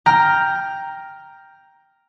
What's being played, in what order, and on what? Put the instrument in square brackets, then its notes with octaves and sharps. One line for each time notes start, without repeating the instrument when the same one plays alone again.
[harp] G5 A#5 F6 G6